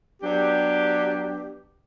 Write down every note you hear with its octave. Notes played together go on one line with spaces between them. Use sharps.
F#3 B3 D4 G4